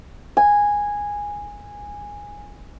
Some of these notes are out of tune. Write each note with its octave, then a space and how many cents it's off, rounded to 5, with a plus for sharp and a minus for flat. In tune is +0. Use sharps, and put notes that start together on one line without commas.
G#5 -10